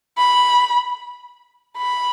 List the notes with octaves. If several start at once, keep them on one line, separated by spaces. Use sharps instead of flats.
B5
B5